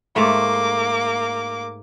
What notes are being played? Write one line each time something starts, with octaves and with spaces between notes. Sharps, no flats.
G#2 A3 A#3 D6